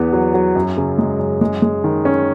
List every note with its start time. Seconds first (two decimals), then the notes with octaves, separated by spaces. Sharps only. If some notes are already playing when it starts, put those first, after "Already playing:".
Already playing: E2 B3
0.13 F#3
0.34 F#3
0.55 F#2
0.77 C#3
0.98 G#3
1.19 F#2
1.41 G#3
1.62 G#3
1.84 D#3
2.05 C#4